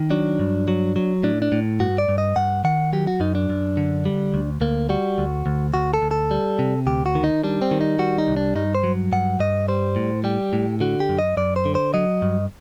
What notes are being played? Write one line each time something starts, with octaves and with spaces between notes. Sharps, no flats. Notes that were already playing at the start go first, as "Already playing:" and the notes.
Already playing: D#3
F#3 D4
G2
F#3
F#3
A2 D4
D4
A2
G2 F#4
D5
G2
D#5
G2 F#5
D#3 F#5
F#3 G4
F#4
F#2 D#4
D4
F#2
D3
G3
D2
D2 A#3
G3 F#4
D2
D2
D2 F#4
A4
D2
A4
G3
C3
D2 G4
F#4
D#3
D#4
G3 D4
C4
D#3
D#4
G3 F#4
D#4
C2
D4
G2 D#4
C5
F#3
G2 F#5
G2 D#5
G3 C5
A2
G3 G4
A2
D3 F#4
G4
F#2
D#5
F#2 D5
C5
D3
C5
F#3 D#5
G2